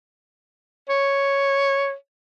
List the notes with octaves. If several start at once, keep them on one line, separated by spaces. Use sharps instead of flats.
C#5